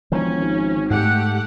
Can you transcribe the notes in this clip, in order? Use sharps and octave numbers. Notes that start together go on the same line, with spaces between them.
E1 D#3 F3 C#4
G#1
G#2 A3 G4 F#5